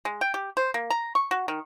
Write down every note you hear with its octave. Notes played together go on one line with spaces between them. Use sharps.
G#3
G5
G4
C5
A#3
A#5
C#6
F#4
D#3